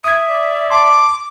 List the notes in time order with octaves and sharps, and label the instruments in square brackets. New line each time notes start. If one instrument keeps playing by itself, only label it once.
[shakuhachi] E5 [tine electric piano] D#6 G#6
[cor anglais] D5
[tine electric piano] A5 C6 [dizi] D6